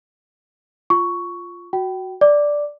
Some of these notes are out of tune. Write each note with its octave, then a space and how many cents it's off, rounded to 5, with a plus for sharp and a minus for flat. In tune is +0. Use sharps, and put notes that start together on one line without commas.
F4 +0 C#6 +10
F#4 +0 G5 -30
D5 +0 D6 +0